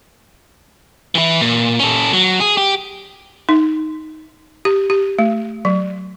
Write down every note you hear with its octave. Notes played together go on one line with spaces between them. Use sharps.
E3 E4
A#2
C#4 A4
F#3
G#4
G4
D#4
G4
G4
A3
F#3